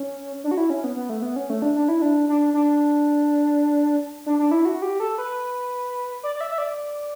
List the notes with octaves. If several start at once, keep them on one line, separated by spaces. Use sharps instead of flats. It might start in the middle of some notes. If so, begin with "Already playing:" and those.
Already playing: C#4
D4
F#4
E4
C#4
B3
B3
A3
B3
C#4
A3
D4
D4
E4
D4
D4
D4
D4
D4
E4
F#4
G4
A4
B4
D5
D5
E5
E5
D5